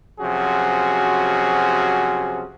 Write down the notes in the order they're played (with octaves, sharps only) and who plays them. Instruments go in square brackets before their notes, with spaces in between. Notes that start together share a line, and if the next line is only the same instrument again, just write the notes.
[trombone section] C3 F3 F#3 C#4 F#4 G#4